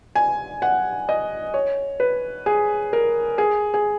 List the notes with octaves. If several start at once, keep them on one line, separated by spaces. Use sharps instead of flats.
G#5
F#5
D#5
C#5
B4
G#4
A#4
G#4
G#4